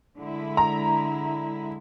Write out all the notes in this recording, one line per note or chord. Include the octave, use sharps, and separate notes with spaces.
D3 G#3 E4
A#5